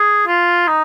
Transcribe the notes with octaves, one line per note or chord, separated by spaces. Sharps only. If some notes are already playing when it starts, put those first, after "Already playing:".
Already playing: G#4
F4
D#4